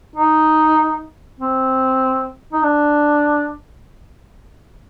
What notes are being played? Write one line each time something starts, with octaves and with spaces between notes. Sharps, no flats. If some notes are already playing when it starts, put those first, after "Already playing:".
D#4
C4
D#4
D4